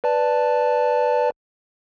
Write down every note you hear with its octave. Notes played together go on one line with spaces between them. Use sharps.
B4 D5 A5